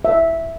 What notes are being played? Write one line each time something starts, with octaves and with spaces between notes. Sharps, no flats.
E5